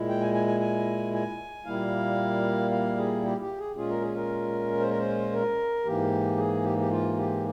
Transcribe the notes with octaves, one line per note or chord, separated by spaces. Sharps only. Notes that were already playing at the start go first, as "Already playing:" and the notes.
Already playing: A#2 G#3 E4
G5
G#5
G#5
G#5
G#5
G#5
A#2 G3 A#3 E4 F5
F5
G#4
G4
G4
G#4
A#2 G#3 C#4 F4 G#4
A#4
G#4
A#4
C5
A#4
C5
A#4
G#2 E3 A#3 G4
G#4
G4
G4
F4
G4